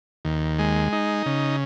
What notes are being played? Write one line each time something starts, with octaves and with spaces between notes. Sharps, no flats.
D#2
G#3
D#4
C#3